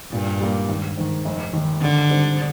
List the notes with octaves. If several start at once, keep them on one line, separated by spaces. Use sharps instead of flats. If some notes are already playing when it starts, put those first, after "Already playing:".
G2 A#2
G3 A#3
G#1
G#2 D#3
F1
D#2 D#3
G#1 D3
G#2 G3 C4